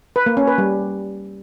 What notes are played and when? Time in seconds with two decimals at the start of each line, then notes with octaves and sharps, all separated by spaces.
0.16 B4
0.26 A#3
0.37 C#4
0.47 B4
0.58 G3